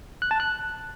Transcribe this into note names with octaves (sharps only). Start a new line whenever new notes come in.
F#6
A5
F#6